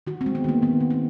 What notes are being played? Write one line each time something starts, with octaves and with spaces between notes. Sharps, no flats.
D#3 F#4
C4
G#3
B3
D#3 A#3
D#3 B3
D#3
C4